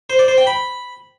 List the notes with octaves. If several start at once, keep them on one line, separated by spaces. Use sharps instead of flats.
C5
D5
C5
G5
B5